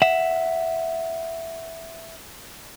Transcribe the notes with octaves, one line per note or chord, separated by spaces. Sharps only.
E5 F#5